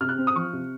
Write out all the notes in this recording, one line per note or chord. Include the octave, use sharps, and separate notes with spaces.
C3 F6
F#6
C4
D#6
F3 C#6
C3